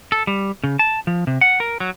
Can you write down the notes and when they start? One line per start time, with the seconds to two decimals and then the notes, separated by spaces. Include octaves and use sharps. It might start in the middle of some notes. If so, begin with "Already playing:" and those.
0.12 A4
0.27 G3
0.64 C#3
0.79 A5
1.07 F3
1.27 C3
1.41 F#5
1.60 A#4
1.80 F#3